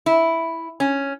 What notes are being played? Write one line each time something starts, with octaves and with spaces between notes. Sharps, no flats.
E4
C#4